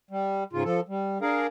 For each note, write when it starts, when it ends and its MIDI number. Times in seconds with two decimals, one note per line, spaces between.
0.11 0.44 55
0.53 0.63 44
0.53 0.63 49
0.53 0.63 65
0.65 0.80 53
0.65 0.80 69
0.89 1.18 55
1.22 1.47 62
1.22 1.47 68
1.22 1.47 70
1.22 1.47 77